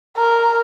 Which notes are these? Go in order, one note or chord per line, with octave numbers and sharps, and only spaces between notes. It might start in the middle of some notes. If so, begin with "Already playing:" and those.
A#4